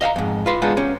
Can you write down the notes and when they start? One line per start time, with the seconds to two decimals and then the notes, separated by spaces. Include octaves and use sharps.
0.01 D#5 F5 F#5 A#5
0.16 F2 G#2
0.46 F4 B4 C6
0.62 G#3 B3 D4 D#4 F4
0.77 C#4 G4